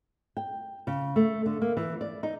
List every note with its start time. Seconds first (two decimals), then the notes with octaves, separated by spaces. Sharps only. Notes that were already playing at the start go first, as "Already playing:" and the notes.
0.37 G5
0.87 C#3
1.16 A3
1.46 D3
1.61 A#3
1.77 E3
2.01 D5
2.23 D#4